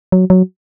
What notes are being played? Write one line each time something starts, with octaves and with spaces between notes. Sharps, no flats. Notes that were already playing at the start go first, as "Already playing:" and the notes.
F#3
F#3